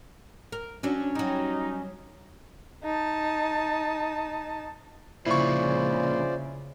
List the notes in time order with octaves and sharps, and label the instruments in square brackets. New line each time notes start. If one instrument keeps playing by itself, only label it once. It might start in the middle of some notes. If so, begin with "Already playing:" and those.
[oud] A#4
[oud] F#3 D4 [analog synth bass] C#4
[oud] F#3 G3 [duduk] D#4
[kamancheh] D#4 A5
[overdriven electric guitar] F2 A#2 [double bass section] C#3 [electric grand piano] E4 C#6 [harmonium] F4 C5 D5